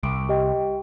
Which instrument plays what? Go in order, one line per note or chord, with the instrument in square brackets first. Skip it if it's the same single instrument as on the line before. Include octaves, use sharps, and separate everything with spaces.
[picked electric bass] C2 [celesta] D7
[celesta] G4 D#5 G5